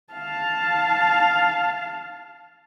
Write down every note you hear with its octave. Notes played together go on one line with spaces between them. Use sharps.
F5 A5